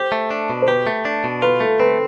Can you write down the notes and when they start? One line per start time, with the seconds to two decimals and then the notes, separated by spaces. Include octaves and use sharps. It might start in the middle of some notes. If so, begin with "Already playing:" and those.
Already playing: G4 C5
0.12 A3
0.30 D4
0.50 B2
0.62 C5
0.68 G4 B4
0.87 A3
1.05 D4
1.24 B2
1.42 F4 B4
1.60 A3 A4
1.80 C4 B4